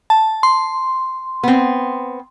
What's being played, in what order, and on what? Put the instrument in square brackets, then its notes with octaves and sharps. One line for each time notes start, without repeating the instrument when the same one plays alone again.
[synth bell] A5
C6
[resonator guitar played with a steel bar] B3 C4